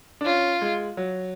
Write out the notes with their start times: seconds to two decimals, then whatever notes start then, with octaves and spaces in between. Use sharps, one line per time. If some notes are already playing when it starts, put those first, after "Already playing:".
0.21 D4
0.26 C#4 F4
0.61 G#3
0.97 F#3